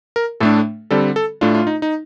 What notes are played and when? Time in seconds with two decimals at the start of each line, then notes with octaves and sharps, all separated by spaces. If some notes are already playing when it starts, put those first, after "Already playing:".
0.16 A#4
0.40 A2 A3 D4 A4
0.91 D3 G3 C4 A4
1.16 A4
1.41 A2 A3 D4 F4
1.55 F4
1.67 D#4
1.82 D#4